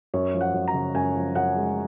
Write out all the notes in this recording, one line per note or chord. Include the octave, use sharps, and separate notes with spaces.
F#2 C#5
F3
F#5
F#2
A#5
C#3
F#2 G#5
F3
F#2 F#5
G#3